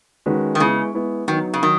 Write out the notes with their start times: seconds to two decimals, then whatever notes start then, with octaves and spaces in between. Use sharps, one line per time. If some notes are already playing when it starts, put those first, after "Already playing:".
0.26 D#3 G#3 C#4 F#4 B4
0.55 D#3
0.60 C#3 G#3 B3 E4
0.94 G#3 B3 E4
1.28 D#3 F#3 B3 D#4
1.54 C#3
1.63 D#3 F#3